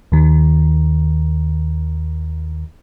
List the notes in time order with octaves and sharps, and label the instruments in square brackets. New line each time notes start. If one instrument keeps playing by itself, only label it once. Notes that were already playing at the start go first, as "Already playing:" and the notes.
[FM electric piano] D#2 D#3